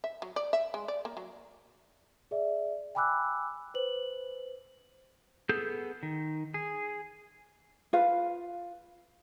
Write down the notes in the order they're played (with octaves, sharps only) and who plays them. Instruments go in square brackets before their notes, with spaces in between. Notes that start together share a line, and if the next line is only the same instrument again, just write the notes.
[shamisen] E5
F#3
D5
E5
G#3
D5
A#3
F#3
[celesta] G#4 D5 E5
G5 G#5 B5 D6 E6 F#6
B4 C5 F#7
[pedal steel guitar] B3 G#4 A4 G6
D#3
G#4
[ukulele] F4 B4 F5